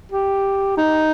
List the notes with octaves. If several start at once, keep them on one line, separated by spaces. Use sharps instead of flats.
G4
D#4